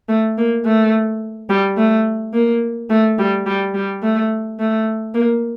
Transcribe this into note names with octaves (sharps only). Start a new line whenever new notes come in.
A3
A#3
A3
G3
A3
A#3
A3
G3
G3
G3
A3
A3
A#3